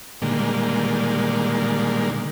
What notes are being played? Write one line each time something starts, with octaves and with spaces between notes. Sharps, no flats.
A#2 D3 D#3 G3 G#3 A#3